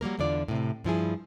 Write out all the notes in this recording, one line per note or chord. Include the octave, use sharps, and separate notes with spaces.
F#3 G3 A#3 A#4
E2 D3 D4 F4 D5
A2 C3
G2 F3 E4 G#4